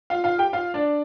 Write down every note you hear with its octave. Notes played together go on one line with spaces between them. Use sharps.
F4 F5
F4 F5
G4 G5
F4 F5
D4 D5